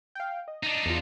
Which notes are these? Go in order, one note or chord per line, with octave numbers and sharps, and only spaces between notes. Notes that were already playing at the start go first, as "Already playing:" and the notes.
F5 G5
D#5
D4 D#4
E2 F4